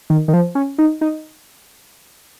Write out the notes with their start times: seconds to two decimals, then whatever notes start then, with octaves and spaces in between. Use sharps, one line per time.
0.10 D#3
0.28 D#3
0.33 F3
0.55 C#4
0.78 D#4
1.01 D#4